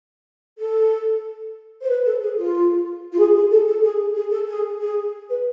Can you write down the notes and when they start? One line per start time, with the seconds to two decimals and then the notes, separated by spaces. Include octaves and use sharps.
0.58 A4
1.81 C5
1.89 B4
2.04 A4
2.21 G#4
2.38 F4
3.12 F4
3.19 G#4
3.34 G#4
3.51 A4
3.67 A4
3.83 G#4
4.15 G#4
4.31 A4
4.48 G#4
4.81 G#4
5.29 B4